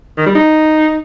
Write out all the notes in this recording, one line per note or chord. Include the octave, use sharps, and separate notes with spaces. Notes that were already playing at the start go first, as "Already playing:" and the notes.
D#3
G3
D#4